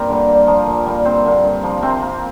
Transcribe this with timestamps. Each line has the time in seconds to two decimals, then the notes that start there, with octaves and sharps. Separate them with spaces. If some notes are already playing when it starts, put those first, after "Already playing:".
Already playing: G2 A#2 C4 F4 G4 A#4 C5
0.09 D3 G3 A#3
0.28 A#2
0.47 F3 A#3
0.67 A#2
0.86 G3 A#3
1.05 G2 C4 C5
1.25 D3 A#3
1.44 G2
1.63 F3 A#3
1.82 C3 C4 C5
2.02 A#3